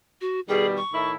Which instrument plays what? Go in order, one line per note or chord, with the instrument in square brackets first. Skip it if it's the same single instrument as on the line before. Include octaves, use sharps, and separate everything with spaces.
[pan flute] F#4
[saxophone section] B2 D#3 G3 [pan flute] G#4
[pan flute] C#6
[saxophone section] A2 D#3 E4